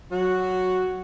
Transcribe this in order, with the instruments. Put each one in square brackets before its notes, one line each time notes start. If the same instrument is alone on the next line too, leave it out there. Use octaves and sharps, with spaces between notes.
[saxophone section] F#3 F#4